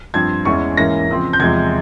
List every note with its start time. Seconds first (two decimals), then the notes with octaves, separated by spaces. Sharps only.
0.14 G2 F3 C4 G#6
0.45 E2 E3 G#3 C#4 C#6
0.77 G#2 E3 A#3 C#4 A#6
1.08 C#3 F3 C4
1.33 G6
1.39 E2 C3 F3 G#3 G#6